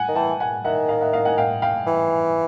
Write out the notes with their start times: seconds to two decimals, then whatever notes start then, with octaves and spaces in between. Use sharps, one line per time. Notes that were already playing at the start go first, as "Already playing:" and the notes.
Already playing: F#5 G#5
0.08 D#3
0.15 E3 G5 A5
0.40 F#5 G#5
0.64 D#3 E5 F#5
0.89 D#5 F5
1.01 E5 F#5
1.13 D#5 F5
1.25 F#5 G#5
1.38 F5 G5
1.62 F5 G5
1.86 E3